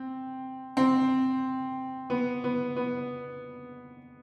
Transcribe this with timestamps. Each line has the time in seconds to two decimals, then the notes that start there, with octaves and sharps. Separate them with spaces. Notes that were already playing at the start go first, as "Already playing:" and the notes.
Already playing: C4
0.77 C4
2.10 B3
2.44 B3
2.76 B3